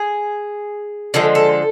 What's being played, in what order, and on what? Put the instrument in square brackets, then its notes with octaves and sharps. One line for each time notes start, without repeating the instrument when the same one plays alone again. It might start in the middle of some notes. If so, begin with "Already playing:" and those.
Already playing: [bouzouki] G#4
D3 F3 G#3 A4
A4